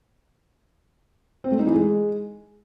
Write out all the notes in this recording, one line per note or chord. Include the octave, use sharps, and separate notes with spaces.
C4
A3
D#4
E3
G#3